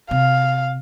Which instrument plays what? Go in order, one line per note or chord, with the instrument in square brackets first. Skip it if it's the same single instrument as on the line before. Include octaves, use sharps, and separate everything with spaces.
[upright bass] C3 [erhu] F5